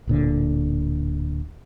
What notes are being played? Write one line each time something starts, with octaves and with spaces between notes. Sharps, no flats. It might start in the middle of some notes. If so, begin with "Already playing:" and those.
D1 A#2 D3